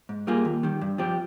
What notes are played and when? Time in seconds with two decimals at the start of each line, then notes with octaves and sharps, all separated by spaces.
0.09 G#2
0.27 G3 A#3 F4 G#4
0.45 D#2
0.63 D#3 G3
0.81 G2
0.98 F3 C4 G4